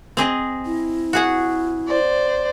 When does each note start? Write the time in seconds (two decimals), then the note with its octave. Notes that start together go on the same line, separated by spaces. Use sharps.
0.17 C4 G#4 D#5
0.66 E4
1.13 F#4 G#4 F#5
1.87 C5 D5